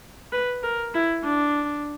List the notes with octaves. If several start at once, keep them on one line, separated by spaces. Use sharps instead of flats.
B4
A#4
E4
D4